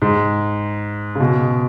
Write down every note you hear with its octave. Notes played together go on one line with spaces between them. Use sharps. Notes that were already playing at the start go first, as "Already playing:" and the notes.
G#2
C#3
B2